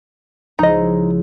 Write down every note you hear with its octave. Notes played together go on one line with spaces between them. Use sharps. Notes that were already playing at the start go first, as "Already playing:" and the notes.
C#2 F3 D#4 E4 D#5